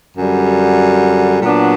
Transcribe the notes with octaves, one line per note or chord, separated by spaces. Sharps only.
F#2 D3 G3
A#2 F#3 B3 D4